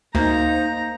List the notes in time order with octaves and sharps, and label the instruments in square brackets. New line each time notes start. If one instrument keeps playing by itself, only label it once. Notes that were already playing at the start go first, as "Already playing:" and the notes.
[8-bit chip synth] D2 [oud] A#3 [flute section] D#4 C5 G6 [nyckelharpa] A#5